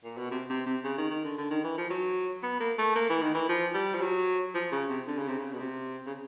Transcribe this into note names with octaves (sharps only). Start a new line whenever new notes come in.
A#2
B2
C3
C3
C3
C#3
D#3
D#3
D3
D3
D#3
E3
F3
F#3
B3
A#3
A3
A#3
E3
D#3
E3
F3
G3
F3
F#3
F3
C#3
C3
D3
C#3
C3
C#3
B2
C3
C#3